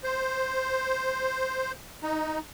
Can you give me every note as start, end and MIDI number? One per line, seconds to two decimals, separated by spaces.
0.04 1.72 72
2.03 2.40 63